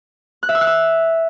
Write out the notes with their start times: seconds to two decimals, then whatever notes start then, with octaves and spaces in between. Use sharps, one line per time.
0.43 F#6
0.49 E5
0.55 E6
0.61 F#6
0.67 E6